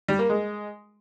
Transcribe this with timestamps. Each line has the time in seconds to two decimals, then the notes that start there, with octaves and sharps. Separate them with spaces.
0.08 G3
0.19 A#3
0.29 G#3